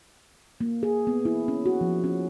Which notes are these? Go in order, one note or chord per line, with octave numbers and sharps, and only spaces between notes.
A#3
G#4
B3
E4
C#4
F#4
F3
C#4